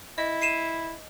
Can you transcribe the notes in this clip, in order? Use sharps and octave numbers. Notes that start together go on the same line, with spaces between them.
E4 D#5
C7 D#7 E7